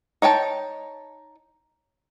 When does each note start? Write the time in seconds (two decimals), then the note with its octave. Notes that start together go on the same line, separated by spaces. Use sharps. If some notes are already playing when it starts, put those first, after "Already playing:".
0.22 D#4 C#5 G5 A5